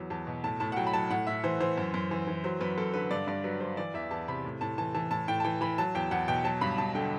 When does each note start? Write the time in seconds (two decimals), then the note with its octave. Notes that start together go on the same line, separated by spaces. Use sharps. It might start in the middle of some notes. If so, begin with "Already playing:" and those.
Already playing: E2 F#3
0.10 E2 A5
0.27 B2
0.44 A2 A5
0.60 A2 A5
0.72 F#5
0.76 F#3 G5
0.87 B5
0.93 F#3 A5
1.10 A2 F#5
1.27 A2 E5
1.44 E3 C5
1.60 E3 C5
1.78 F#2
1.94 F#2
2.11 E3
2.27 E3
2.44 F#3 C5
2.60 F#2 B4
2.78 F#2 A4
2.94 D3 B4
3.11 G2 D5
3.27 G2 D5
3.44 F#3 B4
3.60 F#3 C5
3.77 E3 D5
3.94 E2 E5
4.11 E2 A5
4.28 C3 B5
4.45 A2
4.61 A2 A5
4.78 E3 A5
4.95 E3 A5
5.11 A2 A5
5.28 A2 G5
5.40 A5
5.44 E3 G5
5.61 E3 B5
5.78 F#3 A5
5.95 E2 G5
6.11 E2 F#5
6.28 B2 G5
6.44 F#3 A5
6.61 G2 B5
6.78 G2 A5
6.95 D3 G5